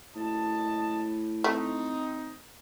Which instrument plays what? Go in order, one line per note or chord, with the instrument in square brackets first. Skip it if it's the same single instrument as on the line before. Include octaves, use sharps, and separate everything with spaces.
[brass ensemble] F#1 D#5 A5 [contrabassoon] A2
[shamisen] A3 [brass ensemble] C4 D#4